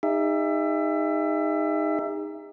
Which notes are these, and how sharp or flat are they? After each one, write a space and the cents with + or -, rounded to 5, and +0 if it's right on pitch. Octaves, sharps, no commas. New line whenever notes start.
D#4 +0 G#4 -45 E5 +25